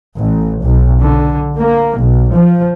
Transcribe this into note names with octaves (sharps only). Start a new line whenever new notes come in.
A1
B1
D3
A#3
B1
F3